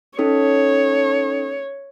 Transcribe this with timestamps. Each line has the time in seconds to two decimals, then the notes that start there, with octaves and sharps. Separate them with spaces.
0.19 C#4 D#4 A4 C#5